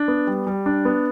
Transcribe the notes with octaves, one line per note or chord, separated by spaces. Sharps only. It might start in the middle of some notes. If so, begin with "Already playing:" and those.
Already playing: D4
B3
G3
G3
D4
B3